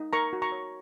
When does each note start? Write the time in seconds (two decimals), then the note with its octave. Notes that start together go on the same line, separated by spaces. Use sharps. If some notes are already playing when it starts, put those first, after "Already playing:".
Already playing: D#4
0.13 A#4 A#5 C#6
0.33 F#4
0.42 A#5 C#6
0.52 C#5